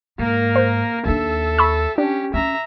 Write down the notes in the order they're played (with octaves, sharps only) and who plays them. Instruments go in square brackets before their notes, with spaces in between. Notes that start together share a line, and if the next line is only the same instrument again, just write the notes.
[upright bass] G#2 [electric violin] A#3 A#4
[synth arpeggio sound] C5
[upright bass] D#2 D4 [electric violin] A4 E5
[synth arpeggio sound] B5 C#6 E6
[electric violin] C#4 G4 [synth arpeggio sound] D4
[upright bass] C4 C#4 [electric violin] E5 A#5